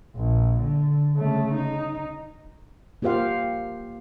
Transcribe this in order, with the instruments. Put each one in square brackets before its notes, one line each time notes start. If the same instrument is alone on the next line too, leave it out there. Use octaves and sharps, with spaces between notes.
[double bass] A#1
D3
C#3 A3
D#4
[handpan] A#3 F4 G4 C5 F5 F#5